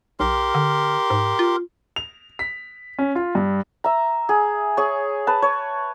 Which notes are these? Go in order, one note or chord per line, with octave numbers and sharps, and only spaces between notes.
B1 G4 A#4 C6
D3
G#2
F4
F7
B6
C#4
F4
G2
E5 A#5
G#4
G#4 C#5
B4 A5
C#5